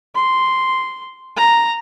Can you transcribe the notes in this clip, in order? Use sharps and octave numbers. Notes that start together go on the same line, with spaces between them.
C6
A#5